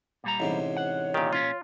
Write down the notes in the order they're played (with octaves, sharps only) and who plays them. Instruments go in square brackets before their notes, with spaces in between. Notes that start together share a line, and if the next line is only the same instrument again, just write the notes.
[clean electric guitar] A#2 G3 A#5
[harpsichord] A1 G#2 C3 [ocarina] C#5
[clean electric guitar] F#5
[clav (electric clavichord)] A#2 D#3 [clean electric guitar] G4
[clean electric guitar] A#2 C#4 [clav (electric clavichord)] F4